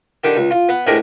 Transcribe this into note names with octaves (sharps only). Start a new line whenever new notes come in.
D3 D#3 G4
C#2
F4
B3
D2 A2 G4 G#4 A#4 D#5